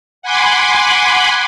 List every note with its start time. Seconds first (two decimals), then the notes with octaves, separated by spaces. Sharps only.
0.22 F#5 G#5 B5 C6 D6